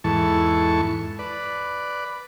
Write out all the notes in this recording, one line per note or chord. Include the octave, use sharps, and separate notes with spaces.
E2 G#2 E3 A4 A5 C#6
B4 D5